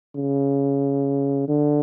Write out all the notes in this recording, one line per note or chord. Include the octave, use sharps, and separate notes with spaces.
C#3
D3